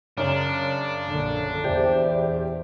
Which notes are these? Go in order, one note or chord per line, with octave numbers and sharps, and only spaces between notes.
F#2 C#3 D4
A#1 D3
E2 G4 C5 D5 E5